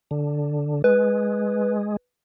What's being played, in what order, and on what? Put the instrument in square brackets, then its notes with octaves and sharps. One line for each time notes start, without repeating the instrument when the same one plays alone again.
[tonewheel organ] D3
[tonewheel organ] G#3 [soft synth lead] B4